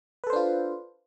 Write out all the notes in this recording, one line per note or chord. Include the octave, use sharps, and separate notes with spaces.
D4 F4 A4 B4 C5